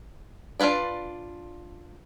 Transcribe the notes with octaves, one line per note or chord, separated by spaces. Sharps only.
D4 F4 F#4 B4 D5